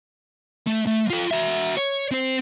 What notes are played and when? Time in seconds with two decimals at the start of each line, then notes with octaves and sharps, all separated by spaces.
0.67 A3
0.87 A3
1.10 F4 A4
1.31 F#4 E5
1.77 C#5
2.11 C4 C5